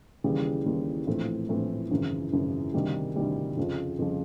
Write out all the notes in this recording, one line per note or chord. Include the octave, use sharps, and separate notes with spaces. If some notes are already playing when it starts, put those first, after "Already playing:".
D#2 C#3 E3 G3
D#2 C#3 E3 G3
A#1 A2 E3 A3 C4
A#1 A2 E3 A3 C4
G#1 F#2 C#3 E3
G#1 F#2 C#3 E3
D2 C3 D#3 G3
D2 C3 D#3 G3
F2 C#3 F3
F2 C#3 F3